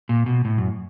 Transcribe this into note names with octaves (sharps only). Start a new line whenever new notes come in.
A#2
B2
A2
F#2